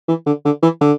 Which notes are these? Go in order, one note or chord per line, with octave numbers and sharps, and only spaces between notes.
E3
D3
D3
E3
D3